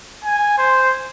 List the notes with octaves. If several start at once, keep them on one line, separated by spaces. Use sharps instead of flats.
G#5
C5